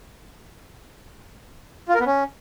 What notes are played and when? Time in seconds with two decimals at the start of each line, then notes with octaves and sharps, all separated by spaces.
1.89 F4
1.94 A#4
2.00 B3
2.06 C#4